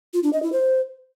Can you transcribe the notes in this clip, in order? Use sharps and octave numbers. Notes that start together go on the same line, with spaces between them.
F4
D4
D#5
E4
C5